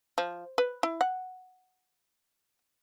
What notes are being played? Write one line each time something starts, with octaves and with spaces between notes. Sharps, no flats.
F3
B4
E4
F#5